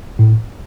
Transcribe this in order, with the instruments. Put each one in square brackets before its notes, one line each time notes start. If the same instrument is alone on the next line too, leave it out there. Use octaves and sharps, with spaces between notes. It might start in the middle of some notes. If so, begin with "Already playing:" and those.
[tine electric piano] A2